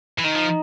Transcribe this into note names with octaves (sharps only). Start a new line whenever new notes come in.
E3
D#3 D#4
F3